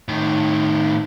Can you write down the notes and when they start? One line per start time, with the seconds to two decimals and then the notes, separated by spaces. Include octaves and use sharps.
0.08 A2 D#3